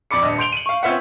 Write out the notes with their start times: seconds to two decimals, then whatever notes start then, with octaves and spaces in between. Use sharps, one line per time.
0.11 F2 D5 B5 D6 C#7
0.22 D#1 G2 D#5
0.38 C6 G6 D7 F7 G7
0.52 D#7 F#7
0.66 F5 C#6
0.83 C4 C#4 F4 B4 E5 F#5